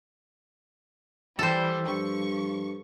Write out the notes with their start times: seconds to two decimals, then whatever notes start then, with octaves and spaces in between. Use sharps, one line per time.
1.39 E3 G3 A4 C5
1.88 G2 F3 C#6